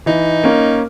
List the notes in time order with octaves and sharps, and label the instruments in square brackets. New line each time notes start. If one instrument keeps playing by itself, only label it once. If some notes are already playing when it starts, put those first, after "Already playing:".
[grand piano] E3 [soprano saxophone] D#4
[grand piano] A#3 C#4